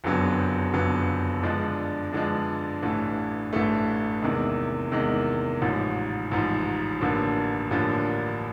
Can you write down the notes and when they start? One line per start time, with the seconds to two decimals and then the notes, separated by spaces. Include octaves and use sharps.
0.04 F#1 F2 D3 F#3 B3
0.73 F#1 F2 D3 F#3 B3
1.43 G2 D3 F3 G#3
2.13 G2 D3 F3 G#3
2.83 A1 G2 E3 A3
3.53 A1 G2 E3 A3
4.22 E2 C3 D#3 G#3
4.92 E2 C3 D#3 G#3
5.62 A1 G#2 F3
6.31 A1 G#2 F3
7.01 A1 G2 D3 F3 A#3
7.71 A1 G2 D3 F3 A#3